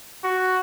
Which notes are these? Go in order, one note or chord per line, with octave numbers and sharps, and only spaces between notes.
F#4